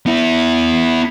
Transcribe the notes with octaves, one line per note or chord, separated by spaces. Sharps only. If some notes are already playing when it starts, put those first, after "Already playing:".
B3 E4